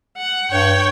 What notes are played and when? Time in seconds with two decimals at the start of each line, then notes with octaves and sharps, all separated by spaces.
0.18 F#5
0.51 G2 C#5 G5